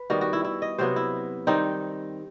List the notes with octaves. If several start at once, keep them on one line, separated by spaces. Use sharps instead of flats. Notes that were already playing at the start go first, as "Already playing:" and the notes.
Already playing: B4
D#3 G3 B3 F#4
F#4
E4
E4
D#5
C3 F#3 B3 C5
E4
D#3 G3 C4 D#4